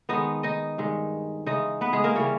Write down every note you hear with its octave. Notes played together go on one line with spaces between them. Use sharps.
D#3 G#3 B3 D#4 D#5
D#4 D#5
G2 D#3 G#3
C#3 E3 G#3 D#4 D#5
B3 B4
G#3 G#4
A#3 A#4
C#3 E3 G3 A#3 C#4 C#5